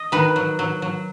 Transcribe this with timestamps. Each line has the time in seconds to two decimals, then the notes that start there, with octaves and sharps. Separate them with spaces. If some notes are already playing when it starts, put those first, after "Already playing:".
Already playing: D#5
0.12 D#3 B4
0.36 F#3
0.59 F#3
0.82 F#3